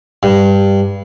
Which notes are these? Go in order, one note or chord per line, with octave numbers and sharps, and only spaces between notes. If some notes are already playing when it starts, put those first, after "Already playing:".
G2